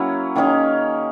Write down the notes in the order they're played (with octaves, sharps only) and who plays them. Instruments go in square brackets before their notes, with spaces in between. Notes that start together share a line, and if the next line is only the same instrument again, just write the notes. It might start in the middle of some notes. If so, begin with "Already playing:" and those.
Already playing: [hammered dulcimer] F#3 A#3 C#4 E4
D#3 A#3 C#4 G#4